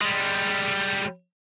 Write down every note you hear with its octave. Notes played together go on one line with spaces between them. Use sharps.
G3 G#3